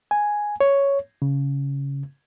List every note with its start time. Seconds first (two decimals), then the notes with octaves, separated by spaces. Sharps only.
0.11 G#5
0.61 C#5
1.22 C#3